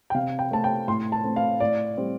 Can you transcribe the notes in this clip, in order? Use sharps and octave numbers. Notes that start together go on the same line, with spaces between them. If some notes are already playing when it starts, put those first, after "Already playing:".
G5
C3 F5
G5
A3 C4 A5
G5
A2 C6
A5
A3 C4
F5
A2 D5
G3 C4